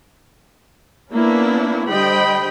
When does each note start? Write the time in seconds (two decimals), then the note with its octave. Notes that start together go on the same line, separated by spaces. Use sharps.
1.12 A#3 B3 C#4 D4 E4
1.90 D3 G3 C5 D#5 G5 B5